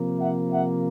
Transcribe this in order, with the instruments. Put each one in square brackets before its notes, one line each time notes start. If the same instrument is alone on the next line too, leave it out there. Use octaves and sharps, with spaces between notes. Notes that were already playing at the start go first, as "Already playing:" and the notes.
Already playing: [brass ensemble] C3 F3 A#3
E5 F#5
E5 F#5